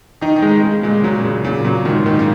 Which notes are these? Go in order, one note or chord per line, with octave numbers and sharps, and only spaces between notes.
D#3 D#4
D#3
G#3
D#3
C#3 G#3
A#2 G#3
A#2 F#3
C#3
A#2 C#3
A#2 F#3
G#2 D#3
A#2 D#3
C#3